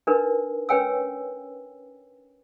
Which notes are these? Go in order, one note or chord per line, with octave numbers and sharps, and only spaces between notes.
D4 D#4 A#4 B4
C#4 B4 C#5 G5 G#5 E6